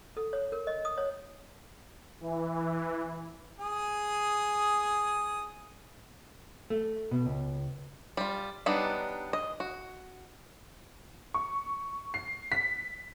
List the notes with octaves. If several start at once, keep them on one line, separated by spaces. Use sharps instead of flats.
A4
C#5
A#4
D#5
D#6
C#5
E3
G#4 D#6
A3
B2
C#2
G3 F4
F#3 G3 B3 D4 D#4
D#5
F#4
C#6
C7
B6